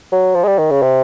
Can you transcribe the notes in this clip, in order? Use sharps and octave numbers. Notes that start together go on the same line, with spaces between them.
F#3
F3
G#3
G3
D#3
C#3
C3